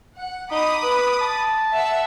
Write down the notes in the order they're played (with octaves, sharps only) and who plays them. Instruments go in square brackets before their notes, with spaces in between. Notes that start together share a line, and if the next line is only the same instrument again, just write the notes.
[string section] F#5
[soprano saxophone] D#4 [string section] B5 D6 D#6
[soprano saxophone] B4
A5
[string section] E5 F#5